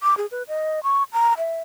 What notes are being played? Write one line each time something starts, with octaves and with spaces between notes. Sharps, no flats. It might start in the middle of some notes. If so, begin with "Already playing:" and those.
D6
G#4
B4
D#5
C#6
A#5
E5